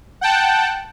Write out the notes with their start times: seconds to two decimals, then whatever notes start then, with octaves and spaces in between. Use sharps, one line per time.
0.21 F#5 G5 A5